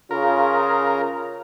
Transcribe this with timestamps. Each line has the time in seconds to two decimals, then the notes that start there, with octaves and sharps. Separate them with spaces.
0.11 C#3 F4 A#4